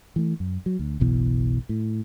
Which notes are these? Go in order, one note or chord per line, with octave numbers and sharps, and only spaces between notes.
E3 A3
F#2
F#3
D2
F#1 B1 B2 E3
A2